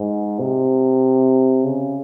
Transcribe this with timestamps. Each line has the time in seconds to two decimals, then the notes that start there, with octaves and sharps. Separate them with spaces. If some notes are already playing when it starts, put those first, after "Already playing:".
Already playing: G#2
0.39 C3
1.64 C#3